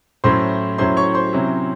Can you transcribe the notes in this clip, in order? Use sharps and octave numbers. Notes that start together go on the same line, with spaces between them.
A2 F#3 C#4 E4 C5 C6
A2 F#3 C#4 E4 C5 C6
C#5 C#6
C5 C6
C3 F#3 C#4 E4